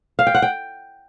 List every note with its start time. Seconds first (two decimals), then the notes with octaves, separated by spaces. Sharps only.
0.19 F5
0.27 G5
0.34 F#5
0.42 G5